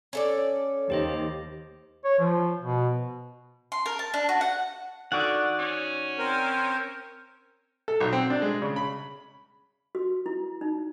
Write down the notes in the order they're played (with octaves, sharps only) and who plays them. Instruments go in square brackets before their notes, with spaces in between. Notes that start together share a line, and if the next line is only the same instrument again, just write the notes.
[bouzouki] C#4 A4 D5
[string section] D#2 [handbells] G4 C5 D#5
[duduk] C#5
F3
B2
[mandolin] C6
A#4
A5
D4
F#4
F#5
[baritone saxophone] D3 [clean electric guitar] D#3 F#4 [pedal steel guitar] D5 F#5
[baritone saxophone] C#4
[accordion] C4 A#4 C5
[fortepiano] A4
B1
C4
D4
G#3
C#3
B5
[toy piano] F#4
E4
D#4